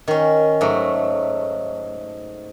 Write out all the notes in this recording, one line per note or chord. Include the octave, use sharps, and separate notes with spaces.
D#3 C#4
G#2 F#3 A3